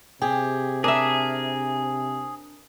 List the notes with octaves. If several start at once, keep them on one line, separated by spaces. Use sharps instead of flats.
C3 G4 G#4
D4 G#4 A#4 E5